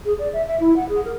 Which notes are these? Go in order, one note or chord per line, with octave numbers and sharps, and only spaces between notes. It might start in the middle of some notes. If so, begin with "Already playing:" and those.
G#4
D5
E5
E5
E4
F#5
G#4
A#4